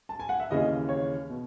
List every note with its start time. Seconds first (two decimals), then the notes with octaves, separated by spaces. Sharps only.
0.09 A5
0.20 G#5
0.29 F#5
0.40 E5
0.50 D#2 C#3 E3 D#5
0.89 C#5
1.29 B2